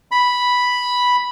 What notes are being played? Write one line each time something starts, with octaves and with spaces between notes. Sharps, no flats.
B5